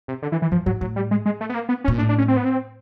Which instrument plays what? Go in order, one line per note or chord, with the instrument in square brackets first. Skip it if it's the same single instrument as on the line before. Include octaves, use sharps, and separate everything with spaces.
[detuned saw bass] C3
D3
E3
E3
[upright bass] G2 [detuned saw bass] F3
[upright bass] G#2 [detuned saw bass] F#3
[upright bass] A2 [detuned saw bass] F#3
[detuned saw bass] G3
G#3
G#3
A3
B3
A#3
B3
C#4
[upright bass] A#2
[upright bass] A2 [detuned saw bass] D4
[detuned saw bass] D4
C#4
C4
B3
C4